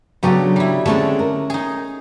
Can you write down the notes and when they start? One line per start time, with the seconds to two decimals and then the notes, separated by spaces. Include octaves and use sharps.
0.23 C#3 F#3 B3 D4 G4 A4
0.56 G3 E4
0.86 D3 G#3 A3 C4 C#4 A5
1.19 A#4
1.50 D#4 G#4